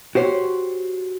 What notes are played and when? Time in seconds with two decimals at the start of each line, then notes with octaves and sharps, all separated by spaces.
0.15 F#4 G4 C5 C#5